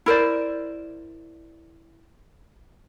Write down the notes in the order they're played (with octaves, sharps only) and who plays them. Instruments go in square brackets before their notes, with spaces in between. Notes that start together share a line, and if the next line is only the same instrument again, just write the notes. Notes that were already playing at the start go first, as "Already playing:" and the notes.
[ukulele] E4 A#4 C5 D5